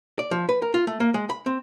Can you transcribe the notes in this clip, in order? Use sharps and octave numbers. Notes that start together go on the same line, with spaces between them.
D5
F3
B4
A#4
F4
A3
A#3
G#3
B5
C4